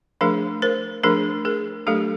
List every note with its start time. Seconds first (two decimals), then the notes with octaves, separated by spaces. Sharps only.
0.21 F3 A3 D4 G#4 A#4
0.62 A#4 C5
1.03 F3 A3 D4 G#4 A#4
1.45 G#4 A#4
1.87 F#3 A3 D4 G4 A4